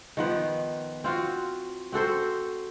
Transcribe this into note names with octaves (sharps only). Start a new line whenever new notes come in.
D#3 F3 B3
C4 F4 F#4
C4 F#4 A4 C5